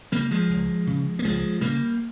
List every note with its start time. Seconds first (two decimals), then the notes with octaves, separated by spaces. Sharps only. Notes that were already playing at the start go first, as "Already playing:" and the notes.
0.12 C#3 G3 A#3
0.31 F3 G#3
0.49 C#2
0.87 C#3
1.19 A#3
1.24 C#2 F3 G#3
1.61 C#3 G3 A#3